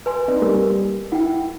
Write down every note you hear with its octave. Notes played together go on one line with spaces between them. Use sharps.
B4 G#5 C6
C4 D#4 D5
G3 A#4
E4 F#5 G5